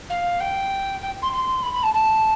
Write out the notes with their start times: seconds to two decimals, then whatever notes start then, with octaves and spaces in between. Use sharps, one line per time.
0.09 F5
0.40 G5
1.01 G5
1.22 C6
1.32 C6
1.62 B5
1.72 B5
1.83 A5
1.93 A5